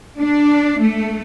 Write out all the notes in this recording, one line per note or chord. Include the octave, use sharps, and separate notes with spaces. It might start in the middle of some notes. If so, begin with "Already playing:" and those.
D4
A3